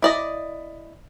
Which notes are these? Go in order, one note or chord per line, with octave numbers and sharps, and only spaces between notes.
E4 D5 D#5